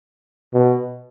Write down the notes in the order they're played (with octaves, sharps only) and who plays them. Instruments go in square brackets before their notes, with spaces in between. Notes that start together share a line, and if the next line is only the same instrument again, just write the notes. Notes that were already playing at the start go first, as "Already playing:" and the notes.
[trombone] B2